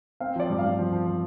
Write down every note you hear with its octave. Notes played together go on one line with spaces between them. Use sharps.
C4 F5
F3 D5
G2
F5
G2
F3
F3
F3